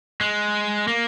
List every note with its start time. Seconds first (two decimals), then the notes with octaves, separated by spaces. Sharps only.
0.21 G#3
0.88 A#3